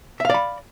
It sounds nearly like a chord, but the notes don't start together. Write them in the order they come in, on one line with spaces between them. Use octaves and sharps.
E5 F5 D5 B5